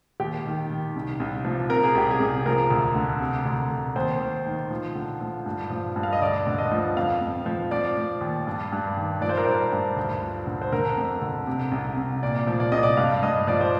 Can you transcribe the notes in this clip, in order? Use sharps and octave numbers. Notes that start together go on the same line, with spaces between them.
D#2 G4
D#3
D#3
C2
C2
F3
C3 A#4
G#4
C2 G4
G#4
C2
F3 A#4
D2
D3
C3
D2
D2
D#2 C5
D#2
D#3
F3
D3
F3
G2
F3
G2
F5
D#5
D2 D5
D3
D#5
F3
F2 F5
F2
F3
F3 D5
F3
D#2
G2
G2
D#3
F3 D5
C5
A#4
G2 C5
G2
D2
F3
D3
C5
D3 A#4
F2
D3
C3
C2
C2
A#2 D5
F3
D5
C2 D#5
D5
G2 F5
G2 D#5
F3 D5
C5